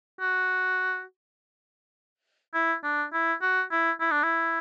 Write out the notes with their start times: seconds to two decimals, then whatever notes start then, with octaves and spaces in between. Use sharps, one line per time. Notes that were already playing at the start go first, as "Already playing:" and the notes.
0.20 F#4
2.54 E4
2.84 D4
3.13 E4
3.42 F#4
3.71 E4
4.00 E4
4.11 D4
4.23 E4